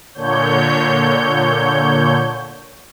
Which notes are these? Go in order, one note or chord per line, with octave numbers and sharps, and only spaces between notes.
A#2 D3 C#5 G6